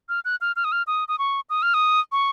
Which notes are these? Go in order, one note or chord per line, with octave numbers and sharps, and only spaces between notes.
F6
F#6
F6
F6
D#6
F6
D#6
D#6
C#6
D#6
F6
D#6
C#6